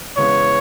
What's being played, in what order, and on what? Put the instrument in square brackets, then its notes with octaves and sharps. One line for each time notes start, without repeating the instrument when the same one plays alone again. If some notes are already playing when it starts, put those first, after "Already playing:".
[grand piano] C#3 E3 G#3 B3 [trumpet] C#5